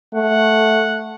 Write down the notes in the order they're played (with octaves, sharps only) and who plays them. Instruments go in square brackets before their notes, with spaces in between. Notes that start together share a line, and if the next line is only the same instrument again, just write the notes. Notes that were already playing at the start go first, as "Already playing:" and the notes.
[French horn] A3 [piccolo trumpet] F#5